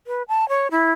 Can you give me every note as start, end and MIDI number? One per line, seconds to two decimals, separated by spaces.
0.07 0.23 71
0.28 0.48 81
0.49 0.68 73
0.71 0.92 64